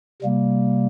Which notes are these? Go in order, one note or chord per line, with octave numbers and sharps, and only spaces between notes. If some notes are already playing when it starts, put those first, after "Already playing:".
C3 G3 A#3